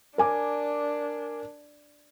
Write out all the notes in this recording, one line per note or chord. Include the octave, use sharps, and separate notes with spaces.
D4 A#4 G#5 D6